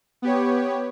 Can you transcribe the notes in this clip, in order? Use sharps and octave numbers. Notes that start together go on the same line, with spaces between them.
B3 G4 C#5